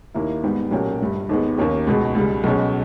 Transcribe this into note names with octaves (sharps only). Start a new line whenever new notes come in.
D#2 D#3 A#3 E4
G#2 G3 B3 G4
B1 A#2 A#3 C#4 G4
G1 G2 G3
D#2 D#3 G#3 B3
D#2 D#3 A#3 C#4 G4
C#2 B2 G#3
C#2 C#3 G3
B1 B2 G#3 C#4